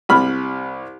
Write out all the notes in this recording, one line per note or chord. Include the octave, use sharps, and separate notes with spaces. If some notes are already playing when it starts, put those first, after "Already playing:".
C2 B5 F6